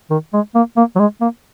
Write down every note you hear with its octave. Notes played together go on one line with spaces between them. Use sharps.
D#3
G#3
A#3
A#3
F#3
G#3
A#3